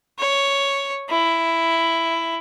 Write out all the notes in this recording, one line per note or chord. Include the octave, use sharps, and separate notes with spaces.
C#5
E4